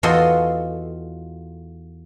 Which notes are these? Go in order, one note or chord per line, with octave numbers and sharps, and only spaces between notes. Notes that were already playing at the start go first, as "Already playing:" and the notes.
E2 F4 F#4 A4 D#5 C6